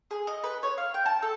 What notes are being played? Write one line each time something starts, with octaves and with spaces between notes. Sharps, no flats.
G#4
D#5
B4
C#5
F5
G5
A5
A4